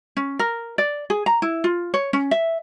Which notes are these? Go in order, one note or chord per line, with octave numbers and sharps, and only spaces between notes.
C#4
A#4
D5
G#4
A#5
E4
F4
C#5
C#4
E5